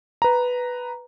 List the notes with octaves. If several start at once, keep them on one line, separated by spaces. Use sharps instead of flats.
B4 A#5